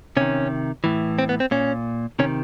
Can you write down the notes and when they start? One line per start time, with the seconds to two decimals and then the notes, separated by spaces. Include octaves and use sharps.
0.17 C3 D#3 C#4
0.84 A2 E3
1.19 C4
1.29 B3
1.40 C4
1.51 A#2 C#4
2.19 C3 D#3 C#4